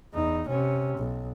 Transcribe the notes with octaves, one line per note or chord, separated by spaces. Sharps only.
E2 D#4
C3 C#4
B1